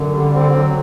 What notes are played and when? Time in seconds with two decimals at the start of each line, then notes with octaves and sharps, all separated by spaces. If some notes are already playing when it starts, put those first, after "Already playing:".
Already playing: F#2 D3
0.13 G3
0.34 C4
0.54 F#3